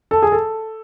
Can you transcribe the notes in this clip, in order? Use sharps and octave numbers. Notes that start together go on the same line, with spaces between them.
A4
G#4
A4